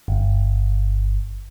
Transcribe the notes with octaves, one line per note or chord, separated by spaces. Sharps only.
G1